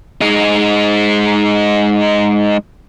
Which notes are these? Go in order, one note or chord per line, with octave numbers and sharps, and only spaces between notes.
G#3 D#4